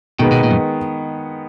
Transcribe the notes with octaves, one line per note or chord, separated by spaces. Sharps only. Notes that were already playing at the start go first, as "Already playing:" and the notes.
B2 D#3 G#3 B3
B2
A#2
F#2